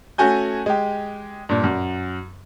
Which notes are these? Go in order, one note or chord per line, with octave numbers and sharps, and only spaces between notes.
A3 C#4 F#4 G#5 G6
G#3 G4
G2 A#2
F#2